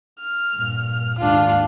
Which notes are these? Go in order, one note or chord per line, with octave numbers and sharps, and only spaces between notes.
F6
G2 A#2
D#2 G#2 D4 F4